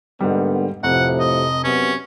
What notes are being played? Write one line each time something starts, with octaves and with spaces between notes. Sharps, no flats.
G#2 D3 G3 A#3 B3
F1 A2 C3 F3 F#5
D#5
F#2 C3 B3 C#4